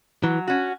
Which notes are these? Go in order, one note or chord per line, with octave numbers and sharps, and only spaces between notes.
E3 F#3
C#4 F#4